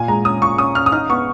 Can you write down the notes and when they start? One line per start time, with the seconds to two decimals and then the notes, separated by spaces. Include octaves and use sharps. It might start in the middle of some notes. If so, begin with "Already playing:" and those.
Already playing: A#2 G#5
0.08 G#3 A#5
0.25 C#4 D#6
0.42 A#2 C#6
0.58 C#4 D#6
0.75 C#4 F6
0.86 D#6
0.92 D#4 F6
1.10 B3 C#6